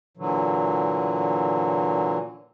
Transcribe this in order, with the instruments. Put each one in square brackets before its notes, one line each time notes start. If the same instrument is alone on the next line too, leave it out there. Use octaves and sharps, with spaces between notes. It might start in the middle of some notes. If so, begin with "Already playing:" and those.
[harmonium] A#2 D3 E3 F#3